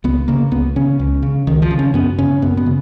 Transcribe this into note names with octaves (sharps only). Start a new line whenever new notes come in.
C#2 B3
C#3 A#3
C#2 B3
C#3 C#4
C#2
C#3
C#2 D#3
F3
C#3
C#4
F#2 B3
C#3 C#4
F#2 B3
B3
C#3